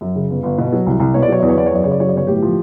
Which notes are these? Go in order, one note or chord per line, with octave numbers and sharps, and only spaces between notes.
F#2
C#3
G1
G1
B2
F#3
C2
C2
B2 C#5
D5
F#3 C#5
E2 D5
C#5
E2 D5
C#5
F#2 D5
C#3 C#5
D5
F#3 C#5
D5
G1 C#5
A2 G4
F3